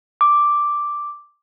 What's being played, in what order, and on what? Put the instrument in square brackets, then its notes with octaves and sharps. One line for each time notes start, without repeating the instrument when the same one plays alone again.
[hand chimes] D6